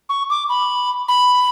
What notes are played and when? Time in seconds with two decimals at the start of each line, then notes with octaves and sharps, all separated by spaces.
0.09 C#6
0.30 D6
0.49 B5
1.08 B5